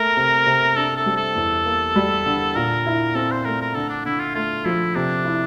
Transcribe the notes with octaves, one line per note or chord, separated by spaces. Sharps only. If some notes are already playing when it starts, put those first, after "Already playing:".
Already playing: A3 A#4
C3
C3
D4 A4
A4
G3
A4
E2
A#3
G3
D3
A#2 A#4
E4
C4 A4
C5
A3 A#4
A#4
D3 A4
D4
D3 E4
F4
A3 F4
F3 E4
C3 D4
E4